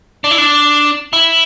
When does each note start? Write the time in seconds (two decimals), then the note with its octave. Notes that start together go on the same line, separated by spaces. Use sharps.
0.24 D4
0.31 E4
0.38 D4
1.13 E4